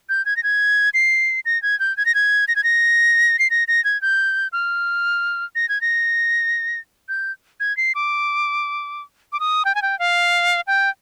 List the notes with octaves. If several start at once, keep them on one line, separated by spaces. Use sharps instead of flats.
G6
G#6
A#6
G#6
C7
A#6
G#6
G6
G#6
A#6
G#6
A#6
G#6
A#6
C7
A#6
A#6
G#6
G6
F6
A#6
G#6
A#6
G6
G#6
C7
D6
D6
D#6
G5
G#5
G5
F5
G5